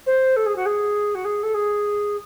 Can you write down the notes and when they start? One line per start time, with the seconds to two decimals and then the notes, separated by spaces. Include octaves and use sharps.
0.06 C5
0.36 A4
0.46 G#4
0.56 F#4
0.66 G#4
1.15 F#4
1.24 G#4
1.43 A4
1.54 G#4